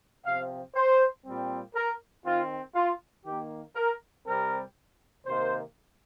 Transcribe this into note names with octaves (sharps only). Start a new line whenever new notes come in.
C3 F3 C4 F5
C5
A#2 G3 C4
A#4
D#3 C4 F4
F4
D#3 A#3 G4
A#4
C3 G3 C4 A#4
C3 D#3 A#3 C5